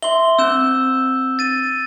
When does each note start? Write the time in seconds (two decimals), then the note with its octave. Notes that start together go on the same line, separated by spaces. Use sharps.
0.02 E5 C6 G7
0.39 C4 E6 G6 E7
1.39 A6 D#7